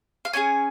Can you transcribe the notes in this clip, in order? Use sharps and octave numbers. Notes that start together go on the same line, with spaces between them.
F5
C#4 F4 G#4 G#5